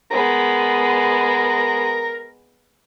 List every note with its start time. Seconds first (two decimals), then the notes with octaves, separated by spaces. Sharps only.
0.11 G#3 B3 A#4